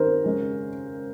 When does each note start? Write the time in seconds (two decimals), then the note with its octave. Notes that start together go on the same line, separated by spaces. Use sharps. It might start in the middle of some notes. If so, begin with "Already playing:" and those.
Already playing: D#3 C4 D#4 A#4 C5
0.24 C#3 G#3 C#4